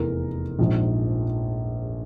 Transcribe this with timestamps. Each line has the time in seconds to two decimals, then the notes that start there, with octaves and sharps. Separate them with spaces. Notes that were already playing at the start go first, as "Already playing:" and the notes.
Already playing: F1 E2 E3 A#4
0.59 A#1 G#2 F3